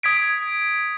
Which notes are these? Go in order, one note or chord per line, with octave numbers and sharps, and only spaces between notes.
D#6 G#6 B6 D7